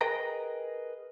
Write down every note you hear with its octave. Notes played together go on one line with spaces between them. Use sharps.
G#4 A#4 B4 D#5 G5 A#5